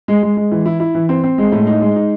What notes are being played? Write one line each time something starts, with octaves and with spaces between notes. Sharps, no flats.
G#3
G#3
G#3
E3
E4
E4
E3
C4
C4
G#3
A2
D#4
G#3
D#4